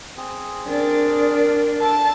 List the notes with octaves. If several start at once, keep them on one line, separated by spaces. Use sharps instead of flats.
C4 G#4
D4 A#4
A4 A5